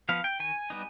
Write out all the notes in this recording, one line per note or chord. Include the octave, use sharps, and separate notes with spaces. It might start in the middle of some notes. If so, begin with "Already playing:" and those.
F3 B3 F5
G5
D#3 G#5
G3 B3 D#4